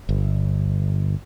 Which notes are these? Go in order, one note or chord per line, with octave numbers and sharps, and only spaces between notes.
G1